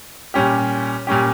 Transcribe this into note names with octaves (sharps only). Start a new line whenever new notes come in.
A#2 G3 C#4 G4
A#2 G3 C#4 G4